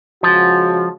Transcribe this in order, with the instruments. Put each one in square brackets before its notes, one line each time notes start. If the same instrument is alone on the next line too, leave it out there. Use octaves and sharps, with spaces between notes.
[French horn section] C#3 G#3 F#4 [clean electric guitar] F3